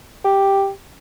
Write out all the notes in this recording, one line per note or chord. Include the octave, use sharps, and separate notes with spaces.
G4